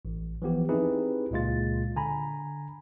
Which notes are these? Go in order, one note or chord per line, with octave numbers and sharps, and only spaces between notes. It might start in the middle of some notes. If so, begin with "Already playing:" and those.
A1
E3 F3 B3 G4
C4 D#4 E4 G4 G#4 B4
C#2 A#2 G#3 F4 A6
D3 G#5 A#5 B5